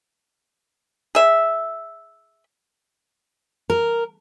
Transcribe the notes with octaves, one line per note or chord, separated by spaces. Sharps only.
G#4 E5
A#4